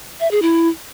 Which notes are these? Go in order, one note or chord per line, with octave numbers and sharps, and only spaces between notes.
E5
G#4
E4